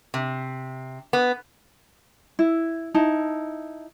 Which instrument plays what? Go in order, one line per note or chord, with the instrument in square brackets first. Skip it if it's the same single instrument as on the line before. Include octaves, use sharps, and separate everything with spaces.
[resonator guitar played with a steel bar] C3
B3
[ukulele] E4
D#4 E4 A5